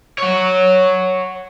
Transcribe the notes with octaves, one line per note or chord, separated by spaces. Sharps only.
C#5 F#5